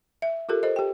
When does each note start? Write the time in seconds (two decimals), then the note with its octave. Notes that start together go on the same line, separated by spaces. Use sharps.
0.22 E5
0.49 F4 G4 A4 A#4
0.63 A4 C5 D#5
0.76 G4 G5